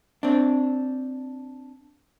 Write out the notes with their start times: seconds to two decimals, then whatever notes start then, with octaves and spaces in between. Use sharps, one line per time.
0.23 C4 D4